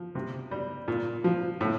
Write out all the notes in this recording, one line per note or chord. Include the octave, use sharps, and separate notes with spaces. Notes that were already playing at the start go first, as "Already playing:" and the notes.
Already playing: F3
C3
G3
A#2
F3
A2